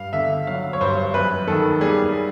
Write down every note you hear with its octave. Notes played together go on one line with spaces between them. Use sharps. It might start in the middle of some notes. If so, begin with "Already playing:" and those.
Already playing: G2 F5
D3 E5
F#3 F5
C#5
G2 C5
F#2 B4
D#3 A4
G3 G#4